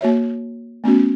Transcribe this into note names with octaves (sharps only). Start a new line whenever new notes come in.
A#3 F#4 C#5 E5
A3 B3 C#4 F#4